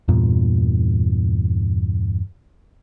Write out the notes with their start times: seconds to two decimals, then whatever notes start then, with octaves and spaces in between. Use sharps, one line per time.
0.08 E2 G2 A#2